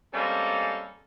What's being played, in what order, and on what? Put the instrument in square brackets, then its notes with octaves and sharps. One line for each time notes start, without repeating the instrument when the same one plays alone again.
[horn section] G3 G#3 A#3 C4 C#4 A4